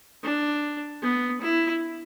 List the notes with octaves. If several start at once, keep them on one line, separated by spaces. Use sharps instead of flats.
D4
B3
E4